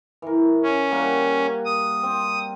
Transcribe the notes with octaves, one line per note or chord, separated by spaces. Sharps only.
E3 A#4
C#4
G3 A#3 F#4
D#6
C4